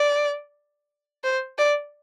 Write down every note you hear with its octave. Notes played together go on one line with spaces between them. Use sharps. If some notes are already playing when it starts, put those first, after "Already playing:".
Already playing: D5
C5
D5